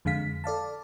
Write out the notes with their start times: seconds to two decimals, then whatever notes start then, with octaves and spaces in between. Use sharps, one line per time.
0.05 F2 D3 G#3 F5 B6
0.44 A4 D5 F5 A5